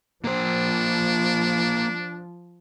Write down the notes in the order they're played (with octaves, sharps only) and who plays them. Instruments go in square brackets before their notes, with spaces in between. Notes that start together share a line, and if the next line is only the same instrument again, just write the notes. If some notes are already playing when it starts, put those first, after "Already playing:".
[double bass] F3 [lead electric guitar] A#3 C5 [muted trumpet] D4